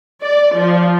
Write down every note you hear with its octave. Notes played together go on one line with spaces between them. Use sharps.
D5
F3